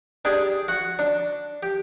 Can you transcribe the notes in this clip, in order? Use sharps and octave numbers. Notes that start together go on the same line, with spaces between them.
D4 G4 G#4 D5
F#4 F#5
D4
G4